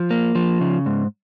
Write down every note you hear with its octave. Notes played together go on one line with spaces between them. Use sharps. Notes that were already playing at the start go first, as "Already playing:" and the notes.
Already playing: F3
A#3
F3
C#3
G#2